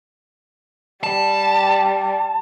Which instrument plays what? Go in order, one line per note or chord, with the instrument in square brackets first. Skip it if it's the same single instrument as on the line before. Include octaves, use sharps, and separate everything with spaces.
[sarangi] G3 [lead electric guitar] A5